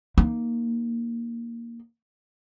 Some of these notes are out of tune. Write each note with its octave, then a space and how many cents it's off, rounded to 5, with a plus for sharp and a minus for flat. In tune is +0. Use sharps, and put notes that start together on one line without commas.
A#3 +0 D#4 +0